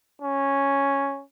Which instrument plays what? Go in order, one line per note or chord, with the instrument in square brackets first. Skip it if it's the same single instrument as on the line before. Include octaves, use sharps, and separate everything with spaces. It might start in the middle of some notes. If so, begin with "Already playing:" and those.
[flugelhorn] C#4